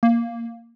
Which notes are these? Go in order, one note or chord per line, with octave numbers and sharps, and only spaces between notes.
A#3